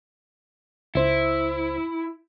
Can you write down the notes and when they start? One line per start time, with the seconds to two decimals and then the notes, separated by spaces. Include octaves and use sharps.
0.95 C#2 E4 C5